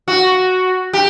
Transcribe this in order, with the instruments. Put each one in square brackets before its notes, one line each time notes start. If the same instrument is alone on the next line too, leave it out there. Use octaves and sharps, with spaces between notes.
[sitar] F#4
G4